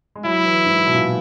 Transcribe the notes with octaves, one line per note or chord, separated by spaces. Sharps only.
G#3
F#3 E4
E3
G#2
B2
A#2